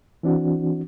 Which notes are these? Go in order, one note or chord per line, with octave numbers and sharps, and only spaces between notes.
E3 C4 D4 F#4